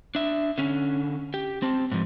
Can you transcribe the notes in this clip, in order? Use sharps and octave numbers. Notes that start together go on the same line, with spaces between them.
D4 E5
D3 C#4
G4
C4 A5
G#2 F3